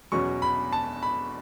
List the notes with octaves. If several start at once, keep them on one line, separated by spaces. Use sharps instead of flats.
E2 B2 F#3 C#4 C#6
B5
A5
B5